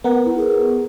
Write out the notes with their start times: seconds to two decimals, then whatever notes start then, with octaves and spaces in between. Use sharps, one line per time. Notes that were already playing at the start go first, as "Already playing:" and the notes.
0.04 B3 A#4 F#5
0.25 E4
0.38 G#4